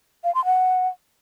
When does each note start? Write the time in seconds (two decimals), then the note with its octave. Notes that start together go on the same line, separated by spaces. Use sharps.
0.24 F5
0.35 C6
0.45 F#5